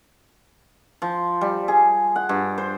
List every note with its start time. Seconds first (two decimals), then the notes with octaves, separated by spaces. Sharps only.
1.02 F3
1.41 G3
1.68 G#4
2.16 F#5
2.29 G2
2.58 C5